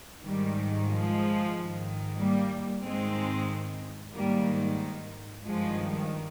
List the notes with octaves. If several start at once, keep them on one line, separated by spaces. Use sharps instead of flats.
G#2 D#3 G3
F3 G#3
G#2 D#3
G3 A#3
G#2 D#3 G#3 C4
G#2 D#3 G3 A#3
G2 D#3 F3 G#3